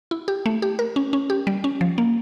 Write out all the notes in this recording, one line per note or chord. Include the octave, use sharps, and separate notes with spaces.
E4
G4
A3
G4
A#4
C#4
C#4
G4
G3
C#4
F3
A#3